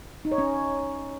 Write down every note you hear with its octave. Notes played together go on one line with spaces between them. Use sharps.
D#4
C#5
C#4